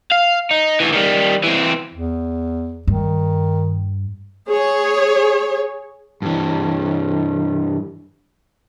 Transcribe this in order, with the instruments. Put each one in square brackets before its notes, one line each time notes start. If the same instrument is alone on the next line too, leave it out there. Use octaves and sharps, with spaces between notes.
[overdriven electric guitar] F5
D#4
D2 E3
D#3 G3
E3 C4
[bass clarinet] E2
[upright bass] G2 [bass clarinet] D#3
[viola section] G#4 C#5
[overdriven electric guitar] G2 E3